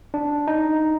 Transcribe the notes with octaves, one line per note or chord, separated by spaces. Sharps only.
D4
D#4